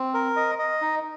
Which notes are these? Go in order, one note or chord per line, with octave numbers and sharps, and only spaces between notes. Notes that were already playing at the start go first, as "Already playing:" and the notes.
Already playing: C4
A#4
D#5
D#5
D#4